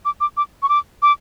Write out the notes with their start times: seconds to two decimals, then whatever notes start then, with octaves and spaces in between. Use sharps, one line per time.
0.05 D6
0.21 D6
0.37 D6
0.63 C#6
0.69 D6
1.02 D6